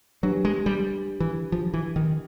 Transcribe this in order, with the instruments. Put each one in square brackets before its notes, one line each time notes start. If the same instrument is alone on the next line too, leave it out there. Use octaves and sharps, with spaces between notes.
[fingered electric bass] F#3 [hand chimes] D4 G4 B4
[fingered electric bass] G#3
G3
E3
F3
E3
D#3